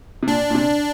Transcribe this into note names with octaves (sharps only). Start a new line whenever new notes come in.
C3
A#2 D4
A#2
C3